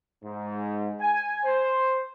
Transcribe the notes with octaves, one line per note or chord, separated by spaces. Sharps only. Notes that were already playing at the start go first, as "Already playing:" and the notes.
G#2
G#5
C5